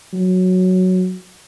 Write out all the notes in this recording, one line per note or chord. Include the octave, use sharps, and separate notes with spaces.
F#3